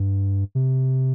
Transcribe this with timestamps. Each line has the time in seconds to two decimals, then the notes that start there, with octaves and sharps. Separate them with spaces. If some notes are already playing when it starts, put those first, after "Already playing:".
Already playing: G2
0.55 C3